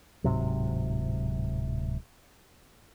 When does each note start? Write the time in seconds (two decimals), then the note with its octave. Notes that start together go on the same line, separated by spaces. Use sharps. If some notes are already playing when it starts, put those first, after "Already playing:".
0.24 D1 G#2 C3 F#3